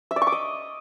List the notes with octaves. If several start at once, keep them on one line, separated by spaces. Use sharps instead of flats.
E5
D5
C#6
D6
D#5